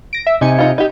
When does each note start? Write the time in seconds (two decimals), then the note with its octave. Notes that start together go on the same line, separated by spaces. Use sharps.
0.13 A#6 D7
0.27 E5
0.41 C3 D#4 G#5 C#7
0.58 D#4 F4
0.78 D#4 G4